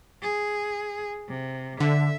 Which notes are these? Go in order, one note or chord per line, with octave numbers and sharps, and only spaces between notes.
G#4
C3
D3 E5